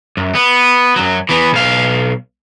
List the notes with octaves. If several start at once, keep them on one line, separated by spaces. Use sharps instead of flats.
F#2
B3
F#2 F#3
E3 B3
B1 F5